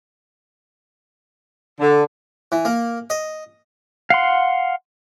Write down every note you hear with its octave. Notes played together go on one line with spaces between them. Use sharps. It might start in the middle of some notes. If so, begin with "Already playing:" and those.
D3
E3
A#3
D#5
F5 F#5 C6